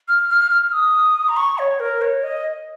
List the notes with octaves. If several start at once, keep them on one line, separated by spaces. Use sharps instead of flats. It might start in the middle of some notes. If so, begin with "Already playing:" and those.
F6
F6
F6
D#6
A#5
C#6
C#5
A#4
C#5
D#5